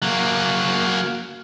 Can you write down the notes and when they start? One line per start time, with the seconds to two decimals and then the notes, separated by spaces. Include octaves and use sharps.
0.02 F#3 A#3